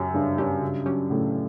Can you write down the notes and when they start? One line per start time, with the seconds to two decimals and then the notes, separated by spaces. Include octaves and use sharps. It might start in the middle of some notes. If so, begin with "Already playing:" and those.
Already playing: F#2 C#3 F#3 C#4 G4
0.14 G2 C#3
0.38 G2 F#3 C#4 G4
0.62 C#3
0.86 F#3 C#4 G4
1.10 A2 C#3